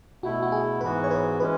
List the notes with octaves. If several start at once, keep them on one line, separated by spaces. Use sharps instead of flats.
B2 A3 E4 F#4
F#4
G#4
G#2 E3 B3 F#4 B4
C#5
B4
E3 G#3 C#4 B4